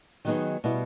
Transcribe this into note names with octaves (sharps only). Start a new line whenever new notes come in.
D#3 F#3 B3 D#4 G#4
B2 G3 B3 E4